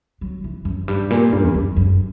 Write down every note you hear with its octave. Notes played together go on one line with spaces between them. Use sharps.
F#3
E3
F#2
G2
A#2
G2
E2
F#2
F#2